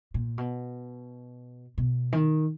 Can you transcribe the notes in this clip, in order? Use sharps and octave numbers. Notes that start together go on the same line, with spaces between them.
A#2
B2
B2
D#3